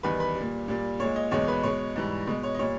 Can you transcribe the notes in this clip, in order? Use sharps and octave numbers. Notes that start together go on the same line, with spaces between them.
E2 D#3 G3 B4
B4
G3
A#2
A#2 G3
A#2 G#3 C#5
D#5
E2 B2 G#3 C#5
B4
B2 G#3 C#5
G#2 E3 G3
B2 G#3
C#5
D#5
A#2 G3 C#5